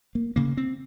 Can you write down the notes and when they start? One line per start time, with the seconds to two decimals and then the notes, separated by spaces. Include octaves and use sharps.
0.15 A#3
0.36 C#3 A#3
0.57 C4